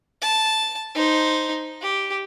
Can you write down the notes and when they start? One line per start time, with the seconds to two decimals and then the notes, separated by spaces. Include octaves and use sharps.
0.22 A5
0.95 D#4 C5
1.82 G4